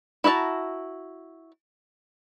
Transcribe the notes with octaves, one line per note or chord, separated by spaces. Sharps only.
E4 F#4 E5 A5 A#5